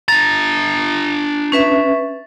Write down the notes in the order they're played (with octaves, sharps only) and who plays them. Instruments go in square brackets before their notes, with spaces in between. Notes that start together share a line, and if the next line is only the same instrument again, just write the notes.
[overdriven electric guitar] D4 A#5 [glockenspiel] A6
[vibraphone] C#4 B4 E5